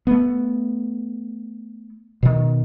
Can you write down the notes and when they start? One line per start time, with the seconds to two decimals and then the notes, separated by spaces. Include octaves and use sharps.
0.07 A3 B3
2.23 B2 D#3